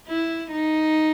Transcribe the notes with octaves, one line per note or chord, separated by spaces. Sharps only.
E4
D#4